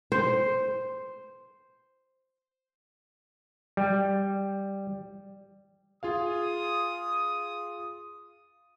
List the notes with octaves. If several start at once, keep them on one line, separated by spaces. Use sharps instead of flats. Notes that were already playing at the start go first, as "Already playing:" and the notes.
C5
G3
F4 G#4 F5 D#6